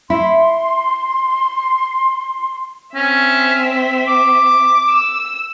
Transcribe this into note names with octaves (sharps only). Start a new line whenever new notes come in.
E4 C6
C4 C#4 E5
D6
E6